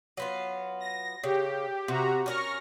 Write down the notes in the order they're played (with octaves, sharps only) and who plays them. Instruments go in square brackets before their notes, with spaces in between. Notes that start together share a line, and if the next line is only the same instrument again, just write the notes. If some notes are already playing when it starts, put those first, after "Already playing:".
[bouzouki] F#3 B3 F4
[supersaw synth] A#6
[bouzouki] C#3 [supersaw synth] G4
[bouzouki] C3 [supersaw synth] F#4 A#5
[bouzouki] C#4 D4 A#4 [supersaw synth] C#6 F6 A#6